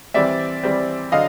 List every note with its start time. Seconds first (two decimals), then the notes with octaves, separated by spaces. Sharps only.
0.14 E3 G3 C4 D5 E5
0.63 E3 G3 C4
1.12 D3 F#3 D#5 F5